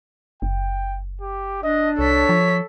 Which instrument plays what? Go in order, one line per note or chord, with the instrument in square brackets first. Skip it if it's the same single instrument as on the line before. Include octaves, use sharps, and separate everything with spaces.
[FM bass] F#1 [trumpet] G5
[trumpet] G4
[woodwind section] D4 [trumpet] D#5
[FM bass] C2 [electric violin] A4 B6 [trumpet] C#5
[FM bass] F3